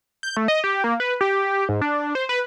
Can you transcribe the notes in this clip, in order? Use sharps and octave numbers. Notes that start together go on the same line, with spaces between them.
G6
A3
D#5
G4
A#3
B4
G4
G#2
D4
C5
B4